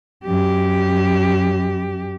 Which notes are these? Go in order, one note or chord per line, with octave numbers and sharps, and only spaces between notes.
F#2 G4